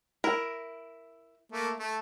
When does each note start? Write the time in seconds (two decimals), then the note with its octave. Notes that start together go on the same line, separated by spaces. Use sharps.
0.24 E4 A#4
1.52 A3 A#3
1.79 A3